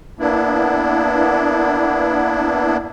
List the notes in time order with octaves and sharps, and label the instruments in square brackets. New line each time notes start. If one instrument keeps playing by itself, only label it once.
[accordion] A#3 B3 D4 E4